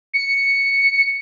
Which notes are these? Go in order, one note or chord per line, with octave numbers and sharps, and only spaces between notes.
C#7